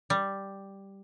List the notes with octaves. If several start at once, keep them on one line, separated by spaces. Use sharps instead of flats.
G3